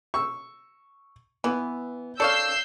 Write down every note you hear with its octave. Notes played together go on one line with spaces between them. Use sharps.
C#6 E6
E3 B3
A4 C#5 D5 F5 E6 G6 C7